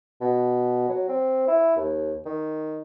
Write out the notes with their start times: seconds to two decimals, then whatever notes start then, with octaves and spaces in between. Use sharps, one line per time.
0.21 B2
0.89 F#3
1.08 C4
1.48 E4
1.76 D#2
2.25 D#3